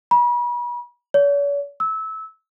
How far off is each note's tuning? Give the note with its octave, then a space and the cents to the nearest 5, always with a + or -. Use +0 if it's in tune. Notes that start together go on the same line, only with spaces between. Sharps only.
B5 -40
C#5 +45
E6 -20